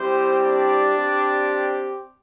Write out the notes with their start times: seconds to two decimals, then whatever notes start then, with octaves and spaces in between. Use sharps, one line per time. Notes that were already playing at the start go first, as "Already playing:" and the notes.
Already playing: G3 C4 E4 G4 C5
0.42 D4 D5
0.96 C4 G4